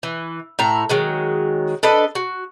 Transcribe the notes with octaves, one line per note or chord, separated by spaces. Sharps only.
E3
A2 E4 A#5
D#3 F#3 G#3
D4 A4 B4 D#5
F#4